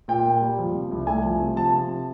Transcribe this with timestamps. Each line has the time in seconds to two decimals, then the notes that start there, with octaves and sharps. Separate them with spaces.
0.08 A#2 G5
0.25 A#3
0.41 G3
0.59 F3
0.75 C3
0.91 C2
1.07 A3 G#5
1.24 F3
1.40 C3
1.56 F3 A5
1.73 C3